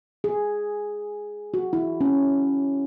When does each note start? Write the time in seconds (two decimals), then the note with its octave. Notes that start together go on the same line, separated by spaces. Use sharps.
0.24 G#4
1.54 F#4
1.73 E4
2.01 C#4